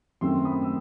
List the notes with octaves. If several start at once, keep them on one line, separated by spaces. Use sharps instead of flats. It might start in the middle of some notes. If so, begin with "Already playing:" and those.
F#2 D#3 A3 C4 C6 E6
B5 D#6
E6